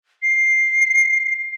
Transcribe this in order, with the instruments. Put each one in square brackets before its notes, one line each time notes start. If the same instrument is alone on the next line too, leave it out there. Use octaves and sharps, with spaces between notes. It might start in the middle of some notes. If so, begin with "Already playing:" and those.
[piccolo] C7